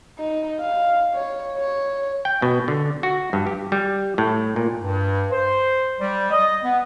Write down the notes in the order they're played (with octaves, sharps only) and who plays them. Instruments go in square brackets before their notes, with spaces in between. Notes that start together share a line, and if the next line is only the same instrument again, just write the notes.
[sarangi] D#4
F5
C#5
C#5
[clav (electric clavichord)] G5
B2
D3
F#4
G2
G4
G3
A2
A#2
[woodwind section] G2
C5
G3
D#5
B3